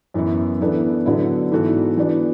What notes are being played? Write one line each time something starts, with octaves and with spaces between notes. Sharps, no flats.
F#2 E3 B3 E4
E3 B3 D4 A4
D3 F#3 B3 E4
G#2 E3 B3 F#4 A4
E3 B3 D4 F#4